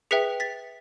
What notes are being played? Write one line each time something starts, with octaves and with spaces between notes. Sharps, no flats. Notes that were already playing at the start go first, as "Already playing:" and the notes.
G#4 B4 E5 G5 B6 C#7
A6 B6